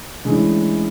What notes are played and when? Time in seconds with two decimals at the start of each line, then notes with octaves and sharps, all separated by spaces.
0.25 E3 G#3 A3 C#4 D4 E4